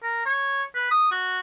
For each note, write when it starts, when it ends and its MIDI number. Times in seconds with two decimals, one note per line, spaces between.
0.02 0.23 70
0.26 0.63 73
0.75 0.87 71
0.91 1.07 87
1.11 1.40 66